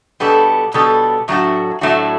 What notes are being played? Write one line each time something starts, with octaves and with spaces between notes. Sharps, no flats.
B2 G3 B3 D4 A4
B2 G3 B3 D4 A4
A2 F#3 A3 D4 F#4
A2 F#3 A3 D4 F#4